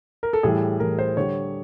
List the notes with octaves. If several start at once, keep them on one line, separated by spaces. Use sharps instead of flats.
A#4
A4
A2 E3 G3 G#4
A2 E3 G3 A#4
C5
D3 G3 C#5